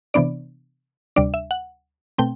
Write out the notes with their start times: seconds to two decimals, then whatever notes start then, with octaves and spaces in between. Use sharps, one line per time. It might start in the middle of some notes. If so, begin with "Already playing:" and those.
0.14 C3 E3 B3 D4 D5
1.16 D2 C3 G3 D4 D5
1.34 E5
1.51 F#5
2.18 B2 A3 C4 G5